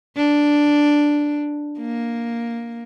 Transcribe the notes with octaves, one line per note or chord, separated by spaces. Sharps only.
D4
A#3